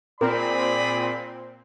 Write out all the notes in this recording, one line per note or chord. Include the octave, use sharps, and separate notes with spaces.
A#2 C4 G#4 A#4 D5 B5